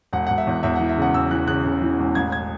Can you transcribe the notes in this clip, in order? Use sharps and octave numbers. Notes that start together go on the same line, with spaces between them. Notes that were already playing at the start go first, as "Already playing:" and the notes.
E1 F#5
E1 F#5
E5
E2
E2 E5
E3 F#5
E5
C#3 F#5
E1 E6
E3 F#6
C#3 F#6
C#3
E3
E1
A1 G#6
G#6